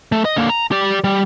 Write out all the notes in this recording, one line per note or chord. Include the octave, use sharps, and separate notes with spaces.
A3
D#5
D3 A#3
A#5
G4 D5
G3